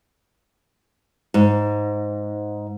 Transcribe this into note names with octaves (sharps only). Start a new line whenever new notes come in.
G#2